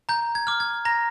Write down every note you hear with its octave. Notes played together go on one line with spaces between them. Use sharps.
A#5 G6
G#6
D6 F6
G#6
A#5 A#6